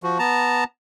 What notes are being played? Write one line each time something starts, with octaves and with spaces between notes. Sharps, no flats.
F3 F#4
B3 A5 A#5